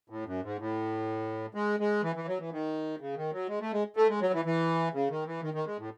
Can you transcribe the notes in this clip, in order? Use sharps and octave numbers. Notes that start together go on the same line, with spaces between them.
A2
F#2
G#2
A2
G#3
G#3
E3
E3
F#3
E3
D#3
C#3
D#3
F#3
G#3
A3
G#3
A3
G#3
F#3
E3
E3
C#3
D#3
E3
D#3
D#3
G#3
A2